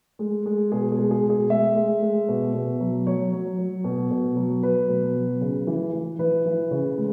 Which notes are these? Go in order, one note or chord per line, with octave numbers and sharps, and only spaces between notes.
G#3
G#3
B2 G#4
G#4
G#3
G#4
B2
G#4
G#3 E5
G#3
G#3
B2
B2
F#3
F#3 C#5
F#3
F#3
B2
B2
F#3
F#3 B4
B2
F#3
C#3
E3
E3
E3 B4
E3
C#3
G#3